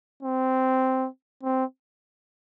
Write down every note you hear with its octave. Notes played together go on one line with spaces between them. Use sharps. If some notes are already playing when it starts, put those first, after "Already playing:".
C4
C4